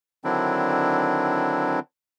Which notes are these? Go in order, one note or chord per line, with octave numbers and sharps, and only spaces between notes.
D3 D#3 F#3 C4 D4 E4